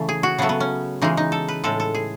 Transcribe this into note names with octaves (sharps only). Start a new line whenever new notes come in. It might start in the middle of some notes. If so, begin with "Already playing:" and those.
Already playing: C#3 E3 A3
G#4
F#4
C#3 F#3 A3 B3
B3
C#4
C#3 E3 G#3 D#4
D#4
A4
B4
A2 G#3 A4
A4
G#4